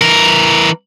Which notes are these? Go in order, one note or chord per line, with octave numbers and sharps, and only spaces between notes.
E3 A#4